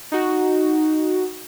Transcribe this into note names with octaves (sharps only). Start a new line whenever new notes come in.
D#4 F#4